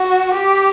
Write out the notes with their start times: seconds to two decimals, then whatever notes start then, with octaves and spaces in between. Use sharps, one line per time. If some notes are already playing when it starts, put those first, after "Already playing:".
Already playing: F#4
0.34 G4